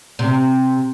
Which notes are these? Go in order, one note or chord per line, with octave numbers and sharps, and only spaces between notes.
C3